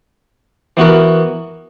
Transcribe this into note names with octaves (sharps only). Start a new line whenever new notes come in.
E3 B3 F#4 A#4